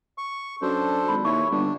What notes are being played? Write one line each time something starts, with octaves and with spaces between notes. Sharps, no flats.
C#6
F#2 D4 A4 C5
G#1 B5
D#2 E4 C#5 C#6
G1 D4